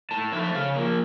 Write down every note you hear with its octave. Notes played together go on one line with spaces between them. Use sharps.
A2 A5
F3 A3 E5
E5
C#3 F5
F3 A#3